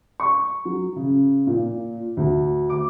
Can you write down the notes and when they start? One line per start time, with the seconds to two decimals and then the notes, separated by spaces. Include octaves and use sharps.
0.20 C#6
0.65 F#3
0.96 C#3
1.47 A#2
2.17 D2
2.70 D6